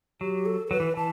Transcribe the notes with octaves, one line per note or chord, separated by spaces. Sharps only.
F#3 G4
A4
A4
F#3 B4
E3
E3 A5